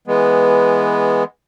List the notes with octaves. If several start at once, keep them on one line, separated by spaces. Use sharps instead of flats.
E3 G#3 B3